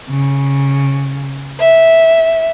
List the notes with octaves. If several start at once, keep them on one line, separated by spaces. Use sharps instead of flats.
C#3
E5